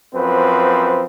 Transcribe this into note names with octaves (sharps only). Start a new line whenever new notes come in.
F#2 F3 C4 B4